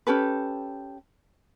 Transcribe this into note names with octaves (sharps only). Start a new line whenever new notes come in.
C#4 G4 A4 B4